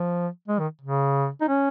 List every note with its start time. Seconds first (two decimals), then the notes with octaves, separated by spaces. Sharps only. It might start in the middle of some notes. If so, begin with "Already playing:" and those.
Already playing: F3
0.48 G#3
0.59 D#3
0.82 C#3
1.41 D#4
1.48 C#4